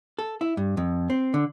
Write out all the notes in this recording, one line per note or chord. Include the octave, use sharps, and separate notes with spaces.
A4
E4
G2
F2
C4
D3